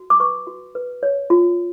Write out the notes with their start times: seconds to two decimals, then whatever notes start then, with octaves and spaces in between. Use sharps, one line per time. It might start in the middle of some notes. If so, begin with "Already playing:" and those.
Already playing: F#4
0.10 D6
0.20 B4 C#6
0.47 F#4
0.75 B4
1.03 C#5
1.30 F4